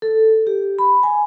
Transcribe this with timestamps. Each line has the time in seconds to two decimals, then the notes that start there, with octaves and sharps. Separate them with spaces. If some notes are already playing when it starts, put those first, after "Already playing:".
0.02 A4
0.47 G4
0.79 B5
1.03 G#5